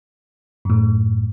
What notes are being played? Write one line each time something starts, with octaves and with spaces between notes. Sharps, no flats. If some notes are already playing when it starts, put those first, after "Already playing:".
F#2 A2